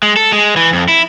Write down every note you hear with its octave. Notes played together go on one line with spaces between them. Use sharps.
G#3
A4
G#3
E3
F2
E4